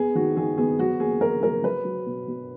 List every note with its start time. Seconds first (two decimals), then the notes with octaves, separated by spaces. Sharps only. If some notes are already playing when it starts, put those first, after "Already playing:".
Already playing: B3 G#4
0.15 D#3 F#4
0.37 D#3 G#4
0.58 B3 G#4
0.79 F#3 F#4
1.00 A#3 G#4
1.21 A#3 A#4
1.43 F#3 A#4
1.63 F#3 B4
1.85 F#3
2.06 B2
2.28 B2